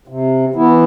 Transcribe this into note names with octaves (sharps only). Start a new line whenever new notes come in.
C3
E3 B3 E4